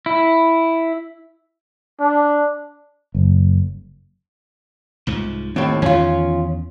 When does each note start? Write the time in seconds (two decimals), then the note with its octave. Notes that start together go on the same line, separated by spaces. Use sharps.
0.06 E4
2.00 D4
3.15 F#1
5.07 C2 G#2 F3
5.56 D#2 A2 C4
5.82 E2 D#3 C#4 F4